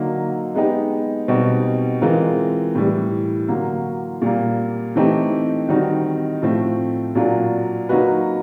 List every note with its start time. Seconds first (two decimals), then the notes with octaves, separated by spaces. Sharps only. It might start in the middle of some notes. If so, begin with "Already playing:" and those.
Already playing: D3 F#3 A#3 D#4
0.55 G#3 B3 D#4 G4
1.28 B2 G3 C4 D#4 G4
2.02 E3 G#3 C4 F4 A#4
2.75 A2 E3 G3
3.48 D3 F#3 A#3
4.22 A#2 G3 A#3
4.96 E3 A3 C4 D#4 G4
5.69 D#3 G3 C4 D#4 F#4
6.42 A2 F3 A3 C4
7.15 A#2 F#3 A#3 D4 F4
7.89 F#3 A#3 D#4 F#4 B4